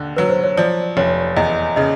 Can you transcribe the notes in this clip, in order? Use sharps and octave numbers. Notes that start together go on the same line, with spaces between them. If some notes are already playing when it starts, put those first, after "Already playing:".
Already playing: D#2 D3
F#3 B4
C5
C#5
F3 D5
F1 C#5
E2 D#5
C#3 D#5